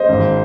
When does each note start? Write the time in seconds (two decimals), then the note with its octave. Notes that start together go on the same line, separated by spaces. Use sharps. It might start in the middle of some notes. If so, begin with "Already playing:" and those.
Already playing: C5 D#5
0.09 G#1